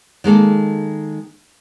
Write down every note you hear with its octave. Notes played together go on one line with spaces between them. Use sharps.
D#3 G#3 A#3 A4